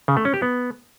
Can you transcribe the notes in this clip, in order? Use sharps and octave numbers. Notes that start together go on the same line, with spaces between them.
C#3
A3
C#4
G4
B3